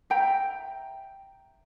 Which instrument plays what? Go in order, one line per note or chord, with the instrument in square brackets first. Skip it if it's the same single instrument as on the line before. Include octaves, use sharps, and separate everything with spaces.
[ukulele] E5 G5 A#5